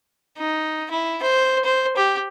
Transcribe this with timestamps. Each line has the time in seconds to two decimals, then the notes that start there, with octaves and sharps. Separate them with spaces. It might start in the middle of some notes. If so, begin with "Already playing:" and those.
0.38 D#4
0.90 E4
1.23 C5
1.64 C5
1.97 G4